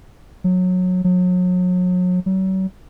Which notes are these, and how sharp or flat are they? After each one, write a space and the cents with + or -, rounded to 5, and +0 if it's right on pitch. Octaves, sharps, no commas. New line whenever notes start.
F#3 -20
F#3 -35
F#3 +40